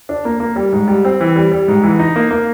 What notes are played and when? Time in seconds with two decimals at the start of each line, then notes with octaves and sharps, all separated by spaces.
0.09 D4
0.25 A#3
0.40 A#3
0.56 G3
0.73 G#2
0.88 G3
1.05 C4
1.20 E3
1.36 G3
1.52 G3
1.68 G#2
1.83 E3
1.99 D#4
2.16 A#3
2.31 A#3